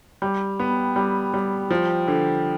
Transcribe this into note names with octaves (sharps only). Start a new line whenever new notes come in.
G3
B3
G3
G3
F3
D3